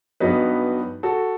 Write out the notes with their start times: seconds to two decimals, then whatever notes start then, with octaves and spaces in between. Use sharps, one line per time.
0.20 G2 F#3 B3 D#4 B4 D#5
1.03 F#4 A4